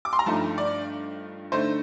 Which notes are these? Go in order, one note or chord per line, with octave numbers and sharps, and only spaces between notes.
D6
C6
A#5
G2 F3 A3 D#4 A5
D5
D3 A3 D#4 C5